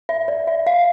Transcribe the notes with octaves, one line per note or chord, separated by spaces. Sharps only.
E5
D5
E5
F5